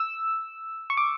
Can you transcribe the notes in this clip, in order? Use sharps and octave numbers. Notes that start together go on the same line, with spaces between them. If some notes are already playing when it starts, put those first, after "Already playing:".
Already playing: E6
C#6
D6